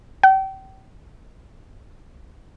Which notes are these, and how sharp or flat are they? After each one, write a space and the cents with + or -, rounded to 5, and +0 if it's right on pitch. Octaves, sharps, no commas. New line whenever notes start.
G5 -30